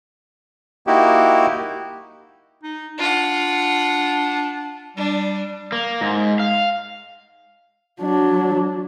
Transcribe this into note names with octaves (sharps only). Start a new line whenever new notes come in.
A#3 D#4 E4 F#4 G4
D#4
D4 F4 F#5
G3 D4
A#3
G#2
F5
F#3 D4